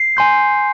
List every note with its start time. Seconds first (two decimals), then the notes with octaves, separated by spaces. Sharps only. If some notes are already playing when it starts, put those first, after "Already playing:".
Already playing: C7
0.17 G#5 C6 G6